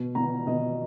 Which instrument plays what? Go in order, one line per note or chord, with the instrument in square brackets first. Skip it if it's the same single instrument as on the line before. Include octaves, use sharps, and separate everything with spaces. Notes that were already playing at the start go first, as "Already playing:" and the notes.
Already playing: [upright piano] B2
B2 A#5
B2 D#5